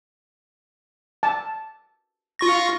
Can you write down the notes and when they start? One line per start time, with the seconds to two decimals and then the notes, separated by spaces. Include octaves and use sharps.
1.23 A5
2.39 F4 C#6 A#6